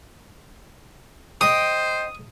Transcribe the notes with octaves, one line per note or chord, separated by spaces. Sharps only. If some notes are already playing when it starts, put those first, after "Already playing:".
C5 D#5 G5 D#6